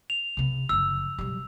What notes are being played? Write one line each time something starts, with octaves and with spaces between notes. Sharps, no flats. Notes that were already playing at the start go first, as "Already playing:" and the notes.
F7
C3 B3
F#1 F2 E6
B1 G3